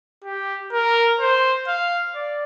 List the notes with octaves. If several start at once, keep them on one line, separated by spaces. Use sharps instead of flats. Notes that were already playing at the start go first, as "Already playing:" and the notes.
G4
A#4
C5
F5
D5